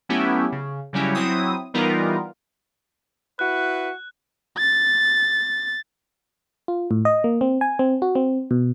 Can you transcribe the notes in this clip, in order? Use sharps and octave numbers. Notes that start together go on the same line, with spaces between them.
F#3 A3 B3 C#4 E4 G4
C#3
C#3 F#3 G3 C#4 E4
F#3 C4 E4 D#6
E3 G3 B3 D#4 F4 A#4
E4 F#4 B4 F#6
A6
F4
A2
D#5
A#3
C4
G#5
C4
F#4
C4
B2